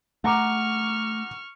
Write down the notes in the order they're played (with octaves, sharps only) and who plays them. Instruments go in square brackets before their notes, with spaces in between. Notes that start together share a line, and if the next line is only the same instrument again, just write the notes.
[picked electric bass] A3 [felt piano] F#5 A#5 D6 [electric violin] C#6 F6